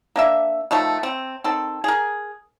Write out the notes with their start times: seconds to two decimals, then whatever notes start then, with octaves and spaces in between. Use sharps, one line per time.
0.16 A#3 D4 E5
0.71 D#3 F3 A3
1.03 C4
1.44 D#3 C4 A4
1.84 G#4 A#4